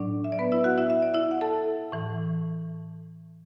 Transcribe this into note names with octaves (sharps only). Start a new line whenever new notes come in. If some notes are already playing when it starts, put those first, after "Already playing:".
Already playing: A2 F#3 D4 D5
E5
D5
B3 B4
E4 E5
F#4 F#5
E4 E5
E5
D5
E4 E5
F#5
A4 A5
A2 E3